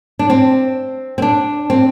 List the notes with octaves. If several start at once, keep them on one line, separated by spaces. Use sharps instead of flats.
D4
C4
C4
D4
C4